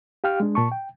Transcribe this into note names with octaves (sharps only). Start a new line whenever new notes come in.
G4 F5 G5 F6
G#3 D4
A#2 A5 C#6
G5